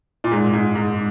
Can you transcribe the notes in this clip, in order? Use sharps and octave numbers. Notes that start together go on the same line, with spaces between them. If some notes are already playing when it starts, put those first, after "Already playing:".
A#2
G#2
G#2
G#2